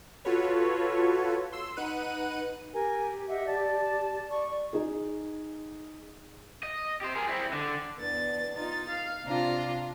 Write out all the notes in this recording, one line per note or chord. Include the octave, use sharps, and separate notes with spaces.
F4 F#4 A4 B4 C#5
C6 E6
D#4 B4 F#5 F#6 D#7
G4 A#4 G#5
D#5 E5 F#5
D5 A5
D5 C#6
D#4 G#4
D#5
G4 C5
G#4 A#4
C4 E4
D3
E2 B3 D4 A6
D#4 F4 A6
F5
C3 D4 F4 A#5